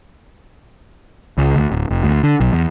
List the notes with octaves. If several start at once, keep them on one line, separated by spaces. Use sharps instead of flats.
C#2
D2
D1
F1
D2
D3
B1
E2